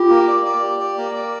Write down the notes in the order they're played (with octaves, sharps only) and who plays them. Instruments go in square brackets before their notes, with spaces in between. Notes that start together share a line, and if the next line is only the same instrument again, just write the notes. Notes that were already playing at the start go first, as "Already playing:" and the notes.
Already playing: [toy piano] F4 [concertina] G4
[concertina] A#3
D5
D5
G4
D5
A#3
D5